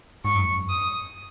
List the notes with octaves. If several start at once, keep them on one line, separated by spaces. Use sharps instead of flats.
G#2 C#6
F#2
F2
F#2
D#6